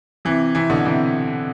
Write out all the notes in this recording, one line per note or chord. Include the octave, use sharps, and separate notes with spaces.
C3 E3
C3 E3
B2 D3
C3 E3